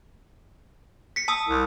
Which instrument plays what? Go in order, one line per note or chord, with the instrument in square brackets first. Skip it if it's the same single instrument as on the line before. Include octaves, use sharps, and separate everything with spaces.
[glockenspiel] B6 C#7
A5 D#6 E6
[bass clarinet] C2